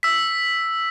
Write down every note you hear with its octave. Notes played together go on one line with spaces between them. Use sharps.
E6 B6